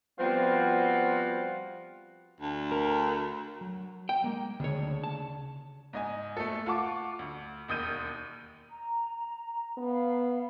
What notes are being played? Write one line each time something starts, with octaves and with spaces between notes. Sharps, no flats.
F3 G3 B3 C4 F4 F#4
D2
A#4
F#3
G5
G#3 A#3
D2 C#3 D4 G#4 C#5
A5
G#2 D#5 G#5
A3 A4
F4 F#5 A5 C#6 D6
D2
E1 D#2 D#6 G6 D#7
A#5
B3 F5